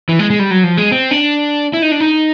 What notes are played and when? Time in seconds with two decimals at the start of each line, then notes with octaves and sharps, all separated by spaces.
0.09 E3
0.19 G#3
0.30 G#3
0.39 G3
0.51 F#3
0.64 F3
0.77 G#3
0.92 C4
1.11 D4
1.73 E4
1.82 D#4
1.92 D4
2.00 D#4